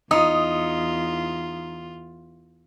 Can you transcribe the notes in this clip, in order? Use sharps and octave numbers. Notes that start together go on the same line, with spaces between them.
E2 D#4 F4 D#6